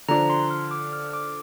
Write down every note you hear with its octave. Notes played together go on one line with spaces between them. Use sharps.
D3 F3 D4 A#5
C6
F6
D6
F6
D6